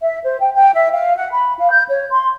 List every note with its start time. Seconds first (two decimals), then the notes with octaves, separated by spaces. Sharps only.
0.03 E5
0.24 C5
0.40 G5
0.54 G5
0.75 E5
0.93 F5
1.16 F#5
1.32 B5
1.59 F5
1.71 G6
1.89 C#5
2.11 C6